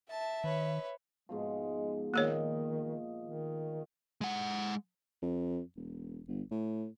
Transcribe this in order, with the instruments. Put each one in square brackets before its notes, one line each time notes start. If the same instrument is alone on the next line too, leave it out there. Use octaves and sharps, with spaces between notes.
[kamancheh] E5 [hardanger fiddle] A5
[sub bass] D#3 [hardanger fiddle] B4 C#5
[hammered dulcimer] G#2 B2 F3 [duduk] G#3
[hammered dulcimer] A#2 D#5 [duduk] D#3 [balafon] A#3 G#4 C#5
[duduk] D#3
[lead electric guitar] G#3 F#5
[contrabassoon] F2
E1
G1
A2